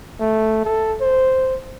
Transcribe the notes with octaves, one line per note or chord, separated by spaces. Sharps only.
A3
A4
C5